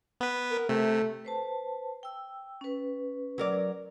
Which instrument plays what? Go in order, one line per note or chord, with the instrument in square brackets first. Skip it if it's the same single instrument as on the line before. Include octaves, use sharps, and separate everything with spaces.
[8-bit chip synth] B3 B4
[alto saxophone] A#4
[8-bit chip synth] C3 [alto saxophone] A3
[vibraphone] B4 C5 A5
G5 E6
C#4 B4
[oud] F#3 A#4 D5